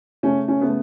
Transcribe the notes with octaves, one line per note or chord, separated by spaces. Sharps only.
C#3 A3 C#4
C#4
C#3 A3 B3